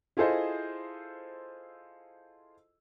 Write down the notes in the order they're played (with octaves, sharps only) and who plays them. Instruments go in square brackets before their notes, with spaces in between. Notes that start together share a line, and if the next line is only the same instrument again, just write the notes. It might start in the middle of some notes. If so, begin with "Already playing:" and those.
[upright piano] E4 F4 G#4 A4 C5 D#5